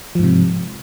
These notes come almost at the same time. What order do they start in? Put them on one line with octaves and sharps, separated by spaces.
F3 G#2 C3